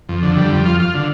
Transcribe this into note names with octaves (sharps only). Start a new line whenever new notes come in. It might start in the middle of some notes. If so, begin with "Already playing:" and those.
F2
D3
G3
F2
F4
F4
D3